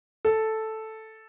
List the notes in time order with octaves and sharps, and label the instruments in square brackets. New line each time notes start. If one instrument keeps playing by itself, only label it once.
[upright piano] A4